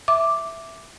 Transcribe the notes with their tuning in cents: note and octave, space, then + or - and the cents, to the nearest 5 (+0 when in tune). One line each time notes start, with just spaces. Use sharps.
E5 +0 D6 +0